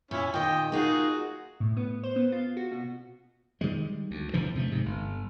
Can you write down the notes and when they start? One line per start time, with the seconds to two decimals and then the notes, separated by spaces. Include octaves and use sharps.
0.11 A#2 C#4 E4
0.34 A#2 D#3 D#5 G5
0.72 A#3 D#4 F4 F#4 G#4
1.60 A2
1.77 B3
2.03 C5
2.16 B3
2.32 F4
2.57 F#4
2.71 B2
3.61 D#3 G3 G#3
4.11 D2
4.33 E2 D3 E3 F3
4.55 C3 F3 G3 A3
4.71 G#2 C3
4.86 G1